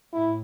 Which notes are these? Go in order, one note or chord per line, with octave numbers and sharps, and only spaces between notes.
A2 E4